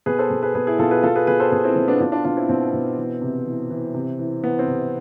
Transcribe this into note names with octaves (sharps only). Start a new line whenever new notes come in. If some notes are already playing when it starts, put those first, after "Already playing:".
B2 G#4 B4
A4 C5
B2
G#4 B4
B2 G#4 B4
E4 G#4
B2 F4 A4
G#4 B4
B2 F4 A4
G#4 B4
B2 G#4 B4
A4 C5
B2 G#4 B4
C4 E4
B2 C4
B3 D4
B2 D4 F4
D4 F4
B2 D4 F4
C4 E4
B2 C4
B2
E3
C3
E3
E3
C3
E3
E3 B3
C4
C3